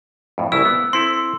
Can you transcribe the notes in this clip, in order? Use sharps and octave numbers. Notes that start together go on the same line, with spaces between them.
F2 A2
C2 C#3 E4 E6
B3
C4 E4 A4 C6